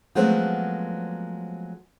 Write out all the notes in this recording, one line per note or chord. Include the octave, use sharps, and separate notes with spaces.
F3 F#3 G#3 A3 B3 C4